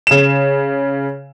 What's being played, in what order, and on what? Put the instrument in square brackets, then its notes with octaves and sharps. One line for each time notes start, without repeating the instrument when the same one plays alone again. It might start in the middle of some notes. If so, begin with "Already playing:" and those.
[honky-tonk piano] C#3 E7